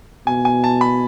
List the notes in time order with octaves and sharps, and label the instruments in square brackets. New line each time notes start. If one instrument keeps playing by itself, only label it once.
[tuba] B2 [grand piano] G#5
[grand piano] G#5
A5
B5